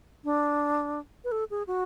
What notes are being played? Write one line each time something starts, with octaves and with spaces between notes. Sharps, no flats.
D4
B4
A4
G#4
F#4